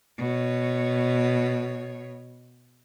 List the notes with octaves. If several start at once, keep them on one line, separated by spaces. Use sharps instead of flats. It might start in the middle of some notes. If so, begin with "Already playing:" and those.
B2 C#5